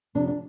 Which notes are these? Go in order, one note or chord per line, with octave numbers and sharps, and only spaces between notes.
F2 C3 F3 C4 D4
D4